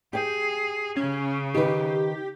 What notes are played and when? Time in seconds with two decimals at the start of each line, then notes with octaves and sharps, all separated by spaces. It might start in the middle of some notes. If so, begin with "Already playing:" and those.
0.13 G4 G#4 G5
0.96 C#3 C#4
1.54 D#3 G4 B4